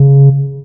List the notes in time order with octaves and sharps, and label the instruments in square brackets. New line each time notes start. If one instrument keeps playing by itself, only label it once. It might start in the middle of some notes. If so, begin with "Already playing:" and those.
Already playing: [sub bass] C#3